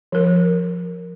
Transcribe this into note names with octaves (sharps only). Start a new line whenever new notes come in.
F3 A#4